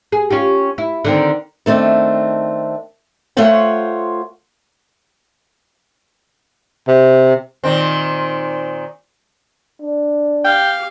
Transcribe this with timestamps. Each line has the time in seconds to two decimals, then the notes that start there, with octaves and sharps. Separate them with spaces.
0.12 G#4
0.31 C#4 F4 G4
0.78 E4
1.05 D3 D#3 C4
1.66 D#3 A3 C4 D4
3.37 A3 F4 C5 C#5 F#5 G5
6.88 C3
7.64 A#2 D#3 C4
9.82 D4
10.44 G4 F5 G5